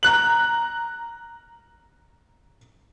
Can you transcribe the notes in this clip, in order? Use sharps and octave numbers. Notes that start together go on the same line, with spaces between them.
A#5 F#6 F#7